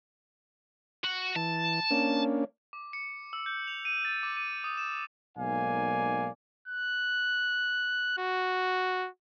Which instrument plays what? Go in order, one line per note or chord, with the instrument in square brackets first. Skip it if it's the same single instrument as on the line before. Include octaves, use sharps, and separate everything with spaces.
[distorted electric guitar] F#4
[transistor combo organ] E3 [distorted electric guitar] A5
[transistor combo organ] A#3 C#4 D4
[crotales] D6
C#7
E6
G6
F7
D#7
A6
D6
D#7
D#6
E7
[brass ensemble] B1 G#2 A#3 D5 F5 G#5
[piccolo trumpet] F#6
F#4